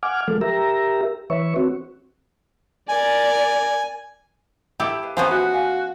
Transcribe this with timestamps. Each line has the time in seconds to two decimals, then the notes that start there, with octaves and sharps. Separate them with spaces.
0.03 F#5 G#5 D6 F6
0.28 F3 G#3 A4
0.41 G4 A#4 E5 A#5
1.30 E3 B4 C#5 E5 C#6
1.56 C4 F#4
2.89 A#4 D5 G#5
4.80 E4 G4 A4 A5
5.03 B4 F5
5.17 F3 B3 C#4 C5 E5 G#5 A#5
5.31 F#4 B4 E5
5.54 B4 F5 G#5